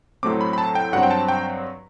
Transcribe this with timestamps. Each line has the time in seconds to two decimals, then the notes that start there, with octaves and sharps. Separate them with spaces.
0.23 A2 F#3 A3 C4 D6
0.41 B5
0.53 B5
0.58 A5
0.75 G5
0.93 G2 F#3 C4 F#5
1.03 G5
1.11 A5
1.28 G5